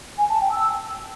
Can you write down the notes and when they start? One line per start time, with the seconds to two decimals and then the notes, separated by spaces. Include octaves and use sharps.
0.17 G#5
0.29 A5
0.40 G5
0.52 E6